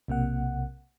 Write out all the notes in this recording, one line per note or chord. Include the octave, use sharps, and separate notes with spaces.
B1 C3 A#3 F#5